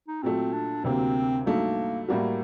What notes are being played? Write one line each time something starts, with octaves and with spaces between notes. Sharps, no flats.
D#4
A#2 F#3 A3 C4
D4
D2 C3 F#3 A#3 C4
G2 F#3 A3 A#3 D#4
A2 G3 A#3 F#4